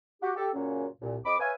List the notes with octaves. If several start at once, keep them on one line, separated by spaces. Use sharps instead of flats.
F#4 G4
G4 A4
F#2 A#2 C#3 F#3 C#4
C2 A#2
F2 C4 D#5 B5 D6
B4 C#5 E5 F5 G#5